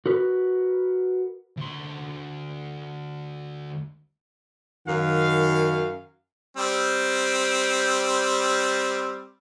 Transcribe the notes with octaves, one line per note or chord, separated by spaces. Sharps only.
F#4 A#4 B4
D2 C6
F#2 D#3 F5
G3 C4